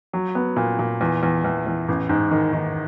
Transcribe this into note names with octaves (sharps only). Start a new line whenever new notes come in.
F#3
B3
A#2
A#2
E2
E2
E2
E2
A1
G#2
D#3
D#3